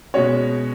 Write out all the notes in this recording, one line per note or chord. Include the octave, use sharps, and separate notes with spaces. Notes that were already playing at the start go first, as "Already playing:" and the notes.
B2 G#3 C#4 F#4 C#5